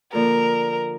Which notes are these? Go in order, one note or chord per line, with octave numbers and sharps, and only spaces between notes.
D3 F3 A#3 F4 A4 A#4